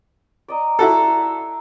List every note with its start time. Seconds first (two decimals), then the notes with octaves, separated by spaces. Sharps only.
0.48 D5 D#5 A#5
0.79 E4 F#4 A4 A#5 C6 D6
1.20 E5